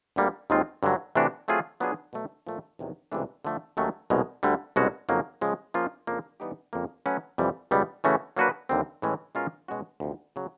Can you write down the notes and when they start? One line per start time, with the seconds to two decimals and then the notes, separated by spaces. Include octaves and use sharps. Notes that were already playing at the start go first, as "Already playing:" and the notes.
0.16 D2 D3 G3 A#3
0.50 D#2 D#3 G#3 C4 F4
0.83 G2 D3 F#3
1.15 C3 E3 A3 D4 F#4
1.48 F#3 A3 C4 F4 G#4
1.80 F#3 B3 D4 F4 G#4
2.13 B2 F#3 A3
2.47 A#2 F3 A3
2.79 E2 C3 D#3 F#3
3.12 C#2 C3 E3 A3 D4
3.45 D3 F3 A3
3.77 D#2 D#3 F#3 A3 C#4
4.10 C2 B2 G#3
4.43 D2 D3 G3
4.76 C2 B2 G#3 C#4 F#4
5.09 F2 C#3 F#3 A#3 D#4
5.41 C#3 F3 G#3
5.74 F3 A#3 C#4 F4 G#4
6.07 F2 C#3 F3 A#3 D4
6.40 E3 G3 B3 D#4 G4
6.73 F2 C#3 F3 A#3
7.06 F#3 A3 C#4 F#4 B4
7.38 F2 C3 E3 G3
7.71 C#2 B2 G3 B3
8.04 C#3 E3 A3 C#4 F#4
8.37 F#3 A#3 D4 F#4 B4
8.69 D#2 D3 G3 C4
9.02 A2 E3 G#3 C#4
9.35 B2 G#3 C#4 F4 A#4
9.68 B2 G#3 C#4 F#4
10.00 D2 C3 F3
10.36 C#3 F#3